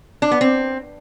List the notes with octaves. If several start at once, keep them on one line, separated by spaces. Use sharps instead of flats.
D4
B3
C4